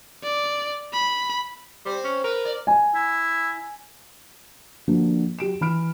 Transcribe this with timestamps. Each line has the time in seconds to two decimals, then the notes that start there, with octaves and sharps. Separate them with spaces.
0.23 D5
0.93 B5
1.85 G3 C4 C5
2.04 C#4
2.24 A#4 B4
2.45 D5
2.67 G#5
2.95 E4
4.88 D3 F3 A#3 D4 F#4
5.39 F#3 G4 D7 E7
5.61 E3 B5 F6 D7